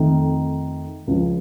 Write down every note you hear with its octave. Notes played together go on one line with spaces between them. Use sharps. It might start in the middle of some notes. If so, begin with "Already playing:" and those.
Already playing: F2 D#3 A3
C#2 C#3 F3